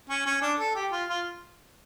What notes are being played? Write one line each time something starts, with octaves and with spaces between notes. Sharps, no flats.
C#4
C#4
D4
A4
G4
F4
F4